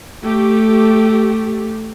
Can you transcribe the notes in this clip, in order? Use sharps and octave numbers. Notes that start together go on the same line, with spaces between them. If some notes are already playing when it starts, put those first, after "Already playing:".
A3 G4